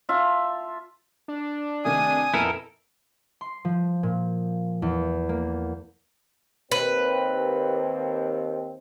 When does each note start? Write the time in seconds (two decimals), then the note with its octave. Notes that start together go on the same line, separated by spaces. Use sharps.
0.09 F4 E5 A5
1.28 D4
1.85 C3 D#3 A3 G#5 D#6
2.34 F2 A#2 B3 E4 A4 A#4
3.41 C6
3.65 F3
4.03 A#2
4.82 E2
5.29 A#3
6.72 D#2 C4 B4